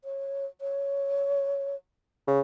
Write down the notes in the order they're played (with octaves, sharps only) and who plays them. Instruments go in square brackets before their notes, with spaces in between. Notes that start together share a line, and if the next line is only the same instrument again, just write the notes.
[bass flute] C#5
C#5
[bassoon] C#3